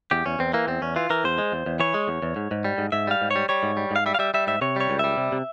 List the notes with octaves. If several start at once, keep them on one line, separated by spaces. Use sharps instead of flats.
E2 G4
E2 C#4
E2 C4
E3 A#3
E2 C4
E2 C#4
E3 F4
E3 A#4
E2 C5
G#3
E2
E2
E3 C#5
G#3
E2
E2
G#2
G#2
G3
G#2
G#2 E5
G3 F5
G#2
C#5
G3
G3 C#5
G#2
G3
G#2 F5
G3 E5
F5
G3 E5
G3 E5
G#2 E5
C3 C#5
G3 C#5
C#2
G3 E5
C3
C3